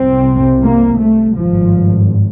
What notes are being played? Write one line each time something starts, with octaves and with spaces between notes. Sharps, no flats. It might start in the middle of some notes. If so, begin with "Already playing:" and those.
Already playing: C2 C3 C4
A#3
A3
G#1 G2 F3